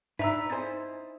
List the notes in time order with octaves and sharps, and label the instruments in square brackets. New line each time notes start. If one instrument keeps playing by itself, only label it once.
[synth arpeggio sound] G#2 D5 [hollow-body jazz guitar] D4 B4 [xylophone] E5 A#5 E6
[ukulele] D#4 E4 C5 [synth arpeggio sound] G#5 A6